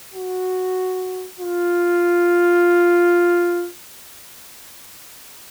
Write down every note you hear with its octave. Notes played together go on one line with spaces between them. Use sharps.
F#4
F4